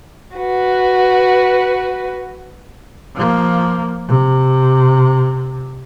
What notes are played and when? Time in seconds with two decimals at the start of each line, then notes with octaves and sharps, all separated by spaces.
0.35 F#4 B4
3.15 F3 A#3
4.08 C3